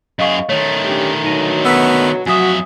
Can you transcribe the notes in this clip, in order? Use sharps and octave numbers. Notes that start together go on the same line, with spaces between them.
F#2 G#4 D#5 F5 C#6
D#3 A3 C#5
C#4 D4 G4
B2 D3 F#3 D#4 A#6 D#7
B3 E6 B6
F2 F#3 F#4 E5 G#5 D#6